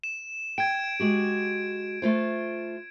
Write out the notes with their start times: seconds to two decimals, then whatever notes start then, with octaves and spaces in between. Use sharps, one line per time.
0.04 E7
0.58 G5 G#6 D7
1.00 G#3 F#4 G4
2.02 A3 F4 C5